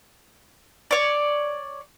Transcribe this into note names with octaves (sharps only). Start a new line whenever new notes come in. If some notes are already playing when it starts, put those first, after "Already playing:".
C#5 D5